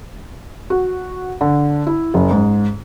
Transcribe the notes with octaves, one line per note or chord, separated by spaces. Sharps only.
F#4
D3
E4
F#1
G#2